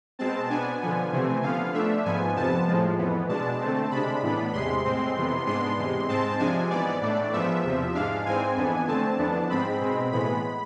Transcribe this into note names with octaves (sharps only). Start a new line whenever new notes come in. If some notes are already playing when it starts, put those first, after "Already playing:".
B2 G#3 C4 A5
B2 B3 D4 G#5
D3 F3 B3
C3 E3 A3 C4
D3 F3 B3 F5
D3 A3 D4 E5
G#2 F3 B3 G#5
F2 C3 F3 B3 A5
A2 F3 G#3
F2 E3 B3
B2 G#3 D4 A5
D3 A3 C4
C3 G#3 D4 B5
A2 E3 B3 D4
E2 C3 G#3 C6
A2 G#3 C4
F2 C3 E3 B3
G#2 G#3 B3 D4 C6
E2 C3 G#3
G#2 G#3 C4 A5
C3 F3 G#3 D4 G#5
G#2 E3 B3 D5
A2 E3 A3 D4
G#2 F3 B3 E5
E2 C3 F3
G#2 G#3 D4 F5
G#2 E3 G#3 C4 G#5
F2 E3 B3 D4
D3 A3 C4 A5
F2 E3 B3 D4
G#2 G#3 C4 B5
B2 G#3 C4
A2 E3 G#3 B3 B5